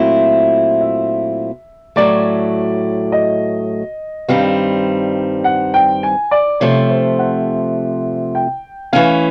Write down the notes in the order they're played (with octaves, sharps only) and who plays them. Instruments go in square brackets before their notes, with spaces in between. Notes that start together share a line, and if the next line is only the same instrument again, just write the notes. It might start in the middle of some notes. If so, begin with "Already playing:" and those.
Already playing: [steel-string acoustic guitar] A#2 F#3 A3 C4 E4
[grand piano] E5
[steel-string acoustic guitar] A2 F#3 A3 [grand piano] D5
[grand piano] D#5
[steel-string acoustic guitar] G2 D#3 G3 C4 [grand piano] F5
[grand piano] F#5
G5
G#5
D5
[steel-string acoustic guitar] C3 F3 A3 [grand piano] C#5
[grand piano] C5
F#5
G5
[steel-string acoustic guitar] E3 A3 C#4 [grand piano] F5